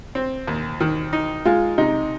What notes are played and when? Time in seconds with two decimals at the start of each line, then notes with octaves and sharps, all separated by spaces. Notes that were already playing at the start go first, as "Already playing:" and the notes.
0.15 C4
0.48 D#2
0.80 D#3
1.13 D#4
1.45 G#3 F4
1.78 C3 D#4